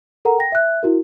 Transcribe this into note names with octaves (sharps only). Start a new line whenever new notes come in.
A4 A#4 F#5 A#5
G5 A#6
E5 F#6
E4 F#4 A#4